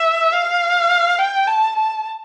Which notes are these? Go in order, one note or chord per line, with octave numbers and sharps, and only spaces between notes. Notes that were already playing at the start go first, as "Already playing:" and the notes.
Already playing: E5
F5
G5
A5
A5